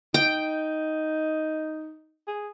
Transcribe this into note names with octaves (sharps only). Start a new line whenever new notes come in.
D#4 G5
G#4